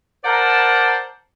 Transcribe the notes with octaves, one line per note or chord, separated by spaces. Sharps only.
A#4 C5 D5 F#5 A5